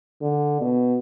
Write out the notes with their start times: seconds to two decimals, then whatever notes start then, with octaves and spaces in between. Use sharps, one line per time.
0.22 D3
0.61 B2